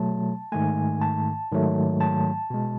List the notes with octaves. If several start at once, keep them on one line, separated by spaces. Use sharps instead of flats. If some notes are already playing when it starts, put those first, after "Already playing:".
Already playing: B2 F#3 A3 A5
G#2 D#3 A3 G#5
A5
G#2 D#3 F#3 A3
A5
B2 G#3